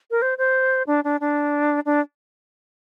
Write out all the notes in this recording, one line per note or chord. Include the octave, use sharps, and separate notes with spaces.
A#4
C5
C5
D4
D4
D4
D4